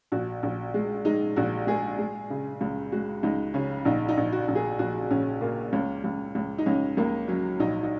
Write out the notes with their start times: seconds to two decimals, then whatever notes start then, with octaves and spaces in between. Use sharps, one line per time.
0.12 A#1 F#4
0.43 A#1
0.74 G#3
1.05 G#3 D#4
1.36 A#1 F#4
1.67 G#3 G#4
1.99 G#3
2.30 C#3
2.61 C#2
2.92 G#3 F#4
3.23 C#2 D#4
3.54 C#3 C#4
3.85 A#1 D#4
4.08 D#4
4.17 A#1
4.33 F#4
4.48 A#1
4.55 G#4
4.79 A#1 F#4
5.10 A#1 C#4
5.41 A#2 A#3
5.73 C#2 C#4
6.04 C#2
6.35 C#2
6.58 D#4
6.66 C#2 C#4
6.97 C#2 A#3
7.28 F#3 C#4
7.59 A#1 D#4
7.83 D#4